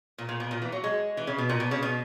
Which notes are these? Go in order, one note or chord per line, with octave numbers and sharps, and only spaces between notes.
A#2
A#2
B2
A#2
E3
F#3
G#3
E3
C#3
B2
A#2
B2
C#3
B2